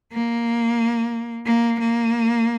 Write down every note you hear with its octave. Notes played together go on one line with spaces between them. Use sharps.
A#3
A#3
A#3